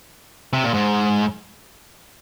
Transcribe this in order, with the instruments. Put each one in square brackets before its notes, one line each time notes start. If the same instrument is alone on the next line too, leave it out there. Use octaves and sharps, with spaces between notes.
[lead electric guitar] C3
A#2
G#2